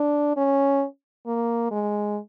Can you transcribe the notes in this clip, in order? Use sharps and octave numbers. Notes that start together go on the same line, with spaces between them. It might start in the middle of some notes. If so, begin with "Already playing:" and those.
Already playing: D4
C#4
A#3
G#3